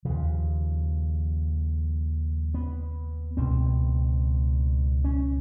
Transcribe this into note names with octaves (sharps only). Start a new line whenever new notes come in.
D#2 C#3 F3
B3
C#2 B2 C4
C#4